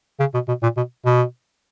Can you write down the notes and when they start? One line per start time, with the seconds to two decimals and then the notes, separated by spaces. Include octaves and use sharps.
0.20 C#3
0.34 B2
0.48 B2
0.63 A#2
0.77 B2
1.05 B2